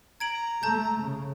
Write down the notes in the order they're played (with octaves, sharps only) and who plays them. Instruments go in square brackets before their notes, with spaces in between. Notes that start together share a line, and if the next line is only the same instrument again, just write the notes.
[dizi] A#5 [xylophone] G#6 D7 F#7
[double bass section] A3 [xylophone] A5 G6
[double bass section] C#3